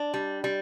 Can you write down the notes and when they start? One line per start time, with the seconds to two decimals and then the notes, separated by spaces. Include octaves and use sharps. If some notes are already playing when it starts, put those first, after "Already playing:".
Already playing: D4
0.14 G3
0.44 G3